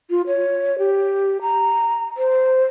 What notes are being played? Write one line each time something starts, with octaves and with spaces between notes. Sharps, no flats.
F4
C#5
G4
A#5
C5